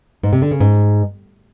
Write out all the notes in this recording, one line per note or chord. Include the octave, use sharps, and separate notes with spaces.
G#2
C3
D3
C#3
G#2